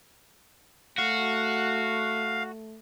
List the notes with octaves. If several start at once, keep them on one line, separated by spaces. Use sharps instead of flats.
A3 F#4 F5